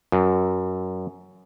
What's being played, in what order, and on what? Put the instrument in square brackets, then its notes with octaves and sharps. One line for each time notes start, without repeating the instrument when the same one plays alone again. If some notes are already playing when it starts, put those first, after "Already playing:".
[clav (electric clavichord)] F#2